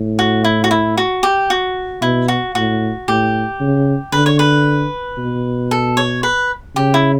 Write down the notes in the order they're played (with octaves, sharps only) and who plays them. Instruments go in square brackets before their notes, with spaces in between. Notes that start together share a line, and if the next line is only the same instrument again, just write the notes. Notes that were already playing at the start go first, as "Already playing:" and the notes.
Already playing: [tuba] A2
[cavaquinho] F#4
E4
F#4
E4
F#4
G4
F#4
[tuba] B2 [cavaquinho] E4
[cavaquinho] F#4
[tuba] A2 [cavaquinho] F#4
[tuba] A2 [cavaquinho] G4
[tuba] C#3
[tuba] D3 [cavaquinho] B4
[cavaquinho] C#5
B4
[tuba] B2
[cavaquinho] A4
C#5
B4
[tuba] C#3 [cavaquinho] G4
[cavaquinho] E4